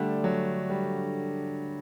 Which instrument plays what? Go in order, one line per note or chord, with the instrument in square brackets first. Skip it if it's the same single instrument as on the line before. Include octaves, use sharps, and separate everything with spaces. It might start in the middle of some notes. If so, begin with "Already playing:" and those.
Already playing: [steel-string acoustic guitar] D3 A3 D4 [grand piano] G3
[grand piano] F#3
G3